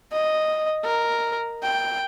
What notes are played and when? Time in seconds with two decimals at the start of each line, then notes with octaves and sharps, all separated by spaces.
0.12 D#5
0.84 A#4
1.63 G5